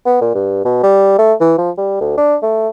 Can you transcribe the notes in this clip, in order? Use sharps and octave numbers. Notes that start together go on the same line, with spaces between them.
B3
A#2
G2
B2
G3
A3
E3
F3
G3
D2
D4
A3